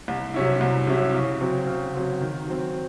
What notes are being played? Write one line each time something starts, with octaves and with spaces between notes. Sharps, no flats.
C2
C3 F#3 C#4 E4
C2
C3 F#3 C#4 E4
C#3
F#3 C4
C#3
F#3 C4
D#3
F#3 C4